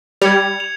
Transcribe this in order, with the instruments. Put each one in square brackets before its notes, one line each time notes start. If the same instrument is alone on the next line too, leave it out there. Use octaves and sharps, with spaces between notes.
[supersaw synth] G3 [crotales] G#6 C#7 F7
[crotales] F7